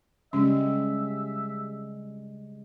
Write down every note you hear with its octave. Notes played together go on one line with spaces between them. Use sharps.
C#3 G3 G#3 C#4 E5